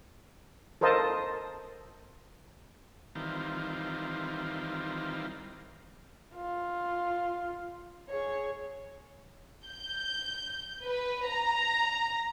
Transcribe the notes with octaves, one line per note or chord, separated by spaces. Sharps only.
A4 A#4 C5 D#5 F5 A5
D#3 E3 G3 C4 F4
F4
G#4 C#5
G6
B4
A#5